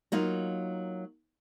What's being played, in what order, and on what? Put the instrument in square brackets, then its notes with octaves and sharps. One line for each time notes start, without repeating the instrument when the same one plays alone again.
[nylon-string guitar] F#3 A#3 D#4 F4